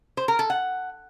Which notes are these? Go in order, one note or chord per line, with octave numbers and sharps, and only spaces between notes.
C5
A#4
A4
F#5